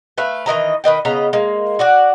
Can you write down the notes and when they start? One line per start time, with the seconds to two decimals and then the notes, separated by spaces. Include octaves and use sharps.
0.18 A3 B4 E5 F5
0.46 D#3 E3 D#5 A#5
0.84 D#3 B4 D#5 G5
1.05 C#3 B3 D#5 A#5
1.33 G#3 A#3
1.79 F#4 D5 F#5